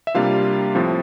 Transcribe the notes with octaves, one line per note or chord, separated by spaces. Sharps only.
E5
C3 G3 A#3 D4 F4 F5
A2 F3 C4